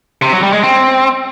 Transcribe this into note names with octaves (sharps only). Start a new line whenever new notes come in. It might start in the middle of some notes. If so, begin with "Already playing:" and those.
C3
F#3
G3
G#3
C4